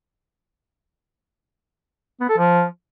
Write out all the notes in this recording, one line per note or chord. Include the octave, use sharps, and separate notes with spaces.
B3
A4
F3